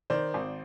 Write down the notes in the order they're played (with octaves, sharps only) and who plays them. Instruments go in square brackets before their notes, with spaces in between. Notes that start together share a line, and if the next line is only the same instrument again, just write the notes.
[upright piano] D#3 C5 D5
G#1